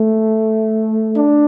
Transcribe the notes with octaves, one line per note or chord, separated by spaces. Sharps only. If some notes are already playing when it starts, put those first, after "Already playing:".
Already playing: A3
D4